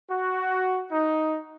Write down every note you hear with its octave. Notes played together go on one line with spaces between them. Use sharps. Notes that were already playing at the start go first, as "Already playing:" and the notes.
F#4
D#4